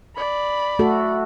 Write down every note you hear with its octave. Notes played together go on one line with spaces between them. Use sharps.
D5 B5
A3 F#4 A4